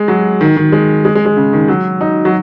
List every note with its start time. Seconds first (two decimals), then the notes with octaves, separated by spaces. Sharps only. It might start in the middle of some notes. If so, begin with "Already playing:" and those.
Already playing: G#3
0.08 F#3
0.41 D#3
0.57 D#3
0.72 G#3
1.05 G#3
1.15 G#3
1.25 G#3
1.37 C#3
1.53 D#3
1.68 F#3
2.01 D#4
2.25 F#3